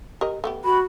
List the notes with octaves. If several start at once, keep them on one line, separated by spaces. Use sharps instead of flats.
G4 A#4 D#5
A3 B3 G4
F#4 B5